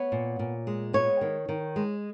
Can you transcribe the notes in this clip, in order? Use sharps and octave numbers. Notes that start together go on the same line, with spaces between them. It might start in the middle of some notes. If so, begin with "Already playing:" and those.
Already playing: B3 C#5
A#2
A#2
G#3
B3 C#5
D#3
D#3
G#3